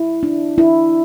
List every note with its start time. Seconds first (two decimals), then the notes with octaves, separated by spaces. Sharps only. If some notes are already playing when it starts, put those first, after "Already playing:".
Already playing: E4
0.23 D4
0.58 E4